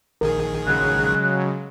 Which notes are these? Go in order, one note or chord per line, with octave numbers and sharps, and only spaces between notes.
A#1 D#3 G#4 A#4
C#3 F#3 G#3 F#6